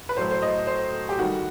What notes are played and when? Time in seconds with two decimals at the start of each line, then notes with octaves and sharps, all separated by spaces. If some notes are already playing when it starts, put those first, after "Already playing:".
0.09 B4
0.17 A2 F#3 A3 C5
0.31 C5
0.42 D#5
0.67 C5
1.09 G4
1.19 D#3 G3 F#4